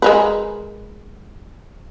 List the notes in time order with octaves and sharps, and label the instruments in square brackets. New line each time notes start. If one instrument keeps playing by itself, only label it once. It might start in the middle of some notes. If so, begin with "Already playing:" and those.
[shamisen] G#3 A#4 B4